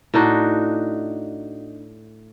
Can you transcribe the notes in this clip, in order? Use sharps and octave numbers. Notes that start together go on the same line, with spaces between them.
A2 D4 D#4 F#4